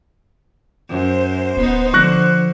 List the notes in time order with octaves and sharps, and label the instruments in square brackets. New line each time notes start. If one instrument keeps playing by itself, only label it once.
[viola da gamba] F#2 [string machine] C5
[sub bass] D1 [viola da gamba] B3 D#4
[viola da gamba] D3 [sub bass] F3 [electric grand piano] C#6 F#6 A#6